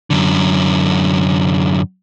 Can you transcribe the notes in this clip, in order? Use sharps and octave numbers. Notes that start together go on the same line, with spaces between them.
F#2 D3